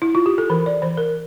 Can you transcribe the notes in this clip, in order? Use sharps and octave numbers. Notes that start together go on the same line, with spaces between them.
E4
F4
G4
A4
E3 A#4
D5
E3 C5
A#4